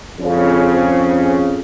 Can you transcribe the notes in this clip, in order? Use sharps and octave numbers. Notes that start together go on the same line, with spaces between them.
F2 C#3